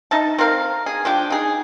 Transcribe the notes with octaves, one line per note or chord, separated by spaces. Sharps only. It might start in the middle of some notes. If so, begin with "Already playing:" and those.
D#4 E5 A5
C4 A#4 F5
G#4
F3 D4 G4
D#4 G#4